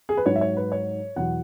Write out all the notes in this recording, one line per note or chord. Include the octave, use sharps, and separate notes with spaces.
G#4
B4
G#2 F#3 C#5
E5
C#5
B4
C#5
E2 B2 F#3 F#5